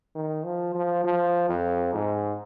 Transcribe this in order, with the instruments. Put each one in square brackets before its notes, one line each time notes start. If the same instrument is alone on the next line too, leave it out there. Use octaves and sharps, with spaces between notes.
[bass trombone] D#3
F3
F3
F3
F2
G#2